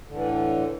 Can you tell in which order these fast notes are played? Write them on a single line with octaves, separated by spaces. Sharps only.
D3 A2 E3